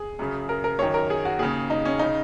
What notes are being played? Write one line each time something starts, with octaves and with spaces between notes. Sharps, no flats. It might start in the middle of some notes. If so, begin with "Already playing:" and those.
Already playing: G#4
F#2 C#3
A#4
A#4
F#2 D#3 C#5
A#4
G#4
F#4
D#2 C#3 G#4
D#4
C#4
C#3 D#4